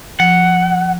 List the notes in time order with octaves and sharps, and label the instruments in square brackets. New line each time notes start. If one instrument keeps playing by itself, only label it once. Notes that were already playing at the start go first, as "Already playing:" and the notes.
[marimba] F3 [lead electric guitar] F#5